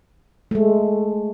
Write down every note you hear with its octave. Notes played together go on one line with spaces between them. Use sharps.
G#3 A3